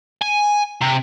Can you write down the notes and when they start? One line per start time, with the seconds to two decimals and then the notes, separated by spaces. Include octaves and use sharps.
0.22 G#5
0.81 C3